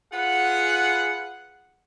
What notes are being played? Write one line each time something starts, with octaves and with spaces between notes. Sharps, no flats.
F4 G#4 B4 F#5